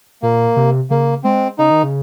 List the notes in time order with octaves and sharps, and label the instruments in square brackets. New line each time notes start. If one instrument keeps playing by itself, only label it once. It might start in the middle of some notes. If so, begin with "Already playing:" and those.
[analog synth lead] A#2 [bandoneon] A#3
[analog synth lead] C3
[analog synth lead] C#3 [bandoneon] A#3
[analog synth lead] G#3 [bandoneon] C4
[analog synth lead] C#3 [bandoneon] D#4
[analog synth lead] D#3
C#3